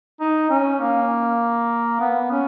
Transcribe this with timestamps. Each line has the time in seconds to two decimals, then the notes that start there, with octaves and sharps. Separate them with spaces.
0.20 D#4
0.50 C#4
0.80 A#3
2.00 B3
2.31 C#4